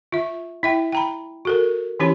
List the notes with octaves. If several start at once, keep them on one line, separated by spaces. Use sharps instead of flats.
F4 E5
E4 E5 G5
G5 A#5 B5
F#4 A4 A#4
E3 C#4 E4 G4 C#5 B5